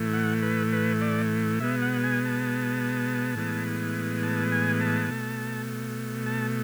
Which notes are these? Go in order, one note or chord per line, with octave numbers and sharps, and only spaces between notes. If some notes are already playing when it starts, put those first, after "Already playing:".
Already playing: A2 E3 A3
F#5
B4
B4
D5
B2 G#3 B3 E5
F#5
G#5
A5
A2 E3 G#3 B3
A5
G#5
A5
B2 A3
A5